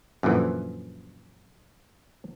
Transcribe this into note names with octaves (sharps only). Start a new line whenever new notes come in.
F#2 A#2 D3 E3 F3